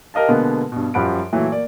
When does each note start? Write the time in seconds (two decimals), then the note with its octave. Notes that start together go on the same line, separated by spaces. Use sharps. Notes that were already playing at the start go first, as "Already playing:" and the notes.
0.14 G4 A#4 D#5 F5 A5
0.28 B2 D3 G#3 A#3 B3
0.72 G2 B2
0.94 F#2 F3 G3 F#5 B5 D7
1.33 A#2 E3 F#3 A3
1.52 A#3 D5